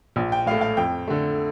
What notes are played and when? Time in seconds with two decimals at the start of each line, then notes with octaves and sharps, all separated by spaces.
0.16 A#1
0.32 G5
0.46 A2 A3 F5
0.61 F5
0.77 F2 G5
1.08 D3 A3